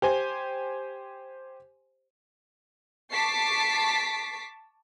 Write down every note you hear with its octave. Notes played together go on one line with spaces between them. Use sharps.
G4 C5 G#5
A5 C#6 D6 A6 B6 C7